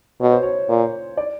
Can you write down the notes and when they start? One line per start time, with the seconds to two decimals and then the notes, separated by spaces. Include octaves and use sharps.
0.21 B2 C#5
0.32 C5
0.43 C#5
0.69 A#2
1.17 D5